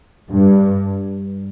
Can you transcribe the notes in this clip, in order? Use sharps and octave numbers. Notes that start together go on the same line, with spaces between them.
G2